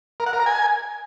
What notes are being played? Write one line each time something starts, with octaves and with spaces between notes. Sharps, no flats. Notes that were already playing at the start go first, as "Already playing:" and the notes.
A#4
F#5
A#4
A#5
G#5